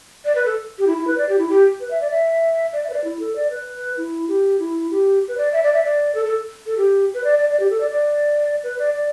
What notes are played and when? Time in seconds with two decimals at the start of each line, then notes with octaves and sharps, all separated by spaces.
0.25 D5
0.35 B4
0.46 A4
0.79 G4
0.87 E4
0.98 E4
1.07 B4
1.18 D5
1.29 G4
1.38 E4
1.49 G4
1.80 B4
1.91 E5
2.01 D5
2.11 E5
2.73 D5
2.84 E5
2.90 B4
2.94 D5
3.04 E4
3.19 A4
3.36 D5
3.51 B4
3.97 E4
4.28 G4
4.59 E4
4.91 G4
5.28 B4
5.37 D5
5.53 E5
5.63 D5
5.73 E5
5.84 D5
6.15 A4
6.25 A4
6.66 A4
6.77 G4
7.14 B4
7.24 D5
7.39 D5
7.49 D5
7.60 G4
7.70 A4
7.80 D5
7.91 D5
8.64 B4
8.79 D5
8.94 D5